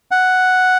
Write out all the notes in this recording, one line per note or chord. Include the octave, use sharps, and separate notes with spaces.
F#5